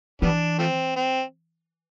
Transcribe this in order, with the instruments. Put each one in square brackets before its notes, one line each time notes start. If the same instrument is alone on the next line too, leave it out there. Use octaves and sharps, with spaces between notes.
[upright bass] E3 [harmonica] G3 B3 D4
[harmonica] F3 A3 C4
C4